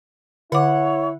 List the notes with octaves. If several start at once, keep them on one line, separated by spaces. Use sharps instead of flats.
D3 E4 C#5 F#5 D6